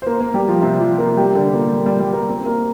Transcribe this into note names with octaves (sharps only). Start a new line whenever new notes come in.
C5
A#3 A#4
A#3 A#4
G3 G4
F3 F4
C3 C4
F3 F4
A#3 A#4
G3 G4
D3 D4
A#2 A#3
G3
G3
G3
A#3 A#4
C4 C5
A#3 A#4